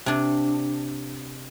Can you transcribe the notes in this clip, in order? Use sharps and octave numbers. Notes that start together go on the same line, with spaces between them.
C3 D4